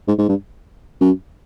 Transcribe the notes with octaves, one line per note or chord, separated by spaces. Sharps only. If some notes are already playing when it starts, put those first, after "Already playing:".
G#2
G#2
G2
F#2